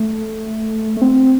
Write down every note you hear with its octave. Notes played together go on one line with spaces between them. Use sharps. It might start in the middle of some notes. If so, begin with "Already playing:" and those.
Already playing: A3
A3
C4